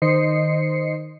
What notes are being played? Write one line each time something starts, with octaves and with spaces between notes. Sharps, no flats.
D#3 C5 D#5 C7 C#7